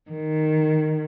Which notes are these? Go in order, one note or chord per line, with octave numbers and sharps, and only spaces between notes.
D#3